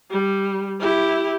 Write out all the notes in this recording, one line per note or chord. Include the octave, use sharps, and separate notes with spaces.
G3
E4 G4